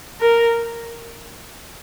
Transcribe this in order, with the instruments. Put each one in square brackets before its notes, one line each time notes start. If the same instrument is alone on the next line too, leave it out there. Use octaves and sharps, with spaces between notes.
[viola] A#4